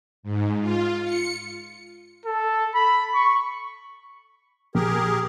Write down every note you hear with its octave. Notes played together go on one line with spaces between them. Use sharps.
G#2
F4
C#7
A4
B5
C#6
A#1 G4 G#4 A#4